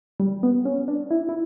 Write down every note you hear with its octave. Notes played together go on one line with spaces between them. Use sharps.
G3
B3
C#4
D4
E4
E4